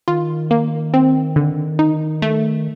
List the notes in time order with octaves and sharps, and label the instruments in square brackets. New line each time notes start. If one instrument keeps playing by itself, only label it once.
[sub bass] D#3 [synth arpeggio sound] F4
[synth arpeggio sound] A#3
C4
D3
D#4
A3